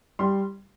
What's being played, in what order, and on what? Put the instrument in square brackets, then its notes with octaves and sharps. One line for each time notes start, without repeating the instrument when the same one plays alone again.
[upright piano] G3 C6